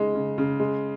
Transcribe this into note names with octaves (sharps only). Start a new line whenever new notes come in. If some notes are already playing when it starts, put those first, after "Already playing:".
Already playing: C#3 G#3 D#4
C#3
C#3
G#3